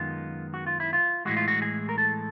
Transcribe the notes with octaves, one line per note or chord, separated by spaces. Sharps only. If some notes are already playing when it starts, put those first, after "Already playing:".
Already playing: F#2 D#3 G#3 B3 F4
F#4
F4
E4
F4
A2 E3 G#3 F#4
F4
F#4
G#4
A#4
A4